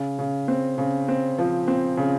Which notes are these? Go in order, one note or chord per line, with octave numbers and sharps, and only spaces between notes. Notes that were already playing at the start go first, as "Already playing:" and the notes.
Already playing: C#3
C#3
C4
C#3
C4
F3
C4
C#3